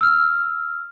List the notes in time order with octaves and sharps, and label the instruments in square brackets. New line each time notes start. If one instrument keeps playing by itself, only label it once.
[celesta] E6 F6